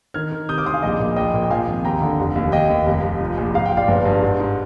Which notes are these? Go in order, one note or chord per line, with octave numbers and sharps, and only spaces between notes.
D#3 F6 G#6
D#3
C3 D#6 G6
D6 F6
D2 C6 D#6
F5 G#5
A#1 D#5
A#2
A#1 D#5 G5
A#2
G5
F3 F5 G#5
G#1
D#2 G5 A#5
D3
F1
D#2
D#2 D#5 G5
D#2
F1
F1
F3
A#1
G#2 F5
G5
A#1
D5 F5
G1
G2
G#2
G#2